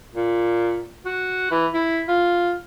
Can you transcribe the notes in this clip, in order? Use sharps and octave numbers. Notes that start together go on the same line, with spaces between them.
A#2
F#4
E3
E4
F4